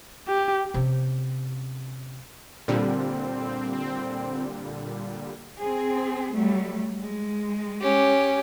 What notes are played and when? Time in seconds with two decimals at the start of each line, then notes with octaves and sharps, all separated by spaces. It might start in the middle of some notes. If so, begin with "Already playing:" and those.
0.28 G4
0.74 C3 C#4
2.68 A#2 D3 G3 C4
5.60 C4 G#4
6.36 F#3 G3 A3
7.01 G#3
7.81 C#4 G4